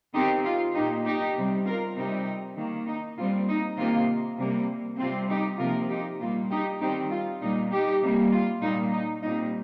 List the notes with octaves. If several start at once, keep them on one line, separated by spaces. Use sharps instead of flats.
D#3 C4 D#4 G4
F4
A#2 A#3 D#4 G4
D#4 G4
C3 G3 C4
F4 A#4
C3 G3 C4 D#4 G4
D#3 A#3
D#4
A#2 G3 C4 F4
D#4
C3 D#3 A#3 F4
C3 G3 A#3
C3 G3 C4 F4
D#4 G4
C3 F3 A#3 F4 A#4
D#4 G4
A#2 G3 A#3 F4
D#4 G4
D#3 G3 C4 D#4 G4
F4
A#2 G3 A#3 D#4
D#4 G4
C3 G3 A#3
F4
A#2 G3 A#3 D#4
D#4
A#2 G3 C4 D#4